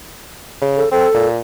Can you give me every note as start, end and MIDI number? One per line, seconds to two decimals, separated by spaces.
0.62 0.83 49
0.77 0.90 69
0.92 1.07 60
0.92 1.27 69
1.14 1.40 46